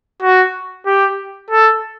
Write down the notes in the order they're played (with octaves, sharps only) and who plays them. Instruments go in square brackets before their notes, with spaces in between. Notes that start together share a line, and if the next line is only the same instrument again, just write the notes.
[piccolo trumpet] F#4
G4
A4